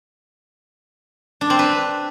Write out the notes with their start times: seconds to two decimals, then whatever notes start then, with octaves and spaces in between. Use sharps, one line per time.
1.41 D4
1.50 C4
1.59 B4